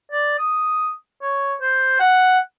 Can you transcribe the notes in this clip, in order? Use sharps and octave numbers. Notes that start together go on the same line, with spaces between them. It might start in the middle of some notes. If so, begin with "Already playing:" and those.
D5
D#6
C#5
C5
F#5